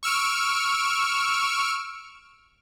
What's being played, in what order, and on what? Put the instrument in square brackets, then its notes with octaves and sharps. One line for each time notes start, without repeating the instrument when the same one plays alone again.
[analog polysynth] C#6 E6 F6 D7